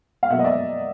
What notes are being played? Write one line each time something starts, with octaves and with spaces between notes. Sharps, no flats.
F5
B2 F#3 A#3 E5 F#5
D#5
D5 E5